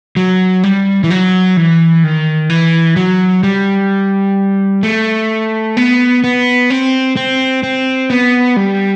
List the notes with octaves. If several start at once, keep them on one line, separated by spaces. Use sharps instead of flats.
F#3
G3
E3
F#3
E3
D#3
E3
F#3
G3
A3
B3
B3
C4
C4
C4
B3
G3